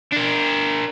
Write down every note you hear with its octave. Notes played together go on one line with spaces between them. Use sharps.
D4 A#4